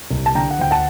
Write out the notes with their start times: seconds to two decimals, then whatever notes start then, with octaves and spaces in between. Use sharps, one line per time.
0.10 C2
0.26 A5
0.35 D3 G5 A#5
0.51 F#5
0.59 D2 G5
0.71 F#5 A5